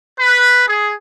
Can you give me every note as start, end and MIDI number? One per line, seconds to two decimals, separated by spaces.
0.20 0.65 71
0.68 0.94 68